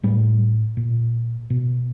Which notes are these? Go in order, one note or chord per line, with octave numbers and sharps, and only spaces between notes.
A2 G3
A#2
B2